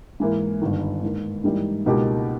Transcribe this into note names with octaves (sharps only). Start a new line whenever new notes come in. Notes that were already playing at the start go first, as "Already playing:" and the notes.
G#2 E3 A#3
G1 G2 D#3
G#2 D#3 A#3
G#2 E3 G3 A#3 D#4
C#2 B2 A#3 D#4 G4